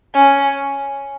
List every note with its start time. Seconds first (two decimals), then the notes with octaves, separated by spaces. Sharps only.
0.14 C#4